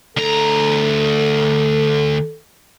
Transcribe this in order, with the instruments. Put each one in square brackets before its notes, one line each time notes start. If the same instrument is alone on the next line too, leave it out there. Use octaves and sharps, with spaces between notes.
[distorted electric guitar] D2 A#5 [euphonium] A4